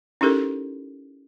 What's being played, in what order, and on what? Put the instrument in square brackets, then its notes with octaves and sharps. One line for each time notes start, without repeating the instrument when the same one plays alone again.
[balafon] C#4 D#4 E4 G4 A4 A#4